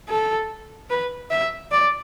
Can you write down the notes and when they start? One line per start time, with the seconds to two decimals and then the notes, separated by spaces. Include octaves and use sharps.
0.09 A4
0.90 B4
1.31 E5
1.72 D5